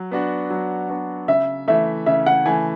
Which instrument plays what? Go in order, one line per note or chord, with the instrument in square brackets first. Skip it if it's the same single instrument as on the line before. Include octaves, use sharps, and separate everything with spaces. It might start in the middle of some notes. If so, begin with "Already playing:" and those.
Already playing: [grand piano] F#3
B3 D4 F#4
F#3
B3 D4 F#4
[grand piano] C#3 [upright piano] E5
[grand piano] E3 A3 [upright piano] E5
[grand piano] C#3 [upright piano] E5
[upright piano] F#5
[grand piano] E3 A3 [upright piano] G#5